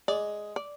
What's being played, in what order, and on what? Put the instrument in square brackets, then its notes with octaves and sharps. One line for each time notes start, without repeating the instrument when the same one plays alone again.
[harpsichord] G#3 [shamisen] D5
[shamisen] D5